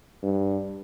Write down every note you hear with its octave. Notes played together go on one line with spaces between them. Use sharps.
G2